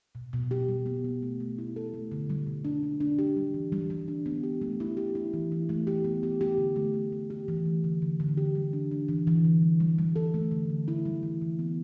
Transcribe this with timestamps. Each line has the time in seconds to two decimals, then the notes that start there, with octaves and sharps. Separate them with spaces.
0.15 B2
0.33 B2
0.51 G4
0.68 G3
0.86 B3
1.04 B3
1.22 A3
1.40 A3
1.58 E4
1.76 A4
1.94 A3
2.12 D3
2.30 G3
2.47 B2
2.65 D4
2.83 D4
3.00 D4
3.19 G4
3.37 G3
3.54 E3
3.72 G3
3.90 G3
4.08 D4
4.26 B3
4.43 G4
4.62 A3
4.80 E4
4.97 G4
5.15 E4
5.33 E3
5.52 E4
5.69 A3
5.87 G4
6.04 B3
6.23 G4
6.41 G4
6.58 D3
6.76 A3
6.94 A3
7.12 A3
7.30 G4
7.48 E3
7.65 A3
7.84 D3
8.02 D3
8.20 D3
8.37 G4
8.55 G3
8.73 D4
8.91 D4
9.09 E3
9.27 E3
9.45 D3
9.62 G3
9.80 G3
9.98 G3
10.16 A4
10.34 A3
10.51 D3
10.70 D3
10.88 E4
11.05 G3
11.23 E3
11.42 E3
11.59 B3